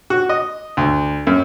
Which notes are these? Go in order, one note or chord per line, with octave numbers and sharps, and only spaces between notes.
F#4
D#5
D2
F#2